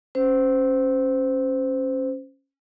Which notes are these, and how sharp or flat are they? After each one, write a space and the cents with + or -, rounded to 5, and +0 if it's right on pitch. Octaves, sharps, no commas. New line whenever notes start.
C#4 -15 C5 -20